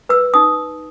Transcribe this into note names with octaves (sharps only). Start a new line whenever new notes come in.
B4 E6
D#4 D#6